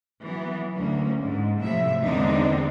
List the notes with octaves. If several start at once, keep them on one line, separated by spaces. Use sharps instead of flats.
E3 F#3 B3
D2 A#3 C#4
G#2
A2 C3 F3 F#3 A3 E5
E2 D3 G#3 C4 D4 D#4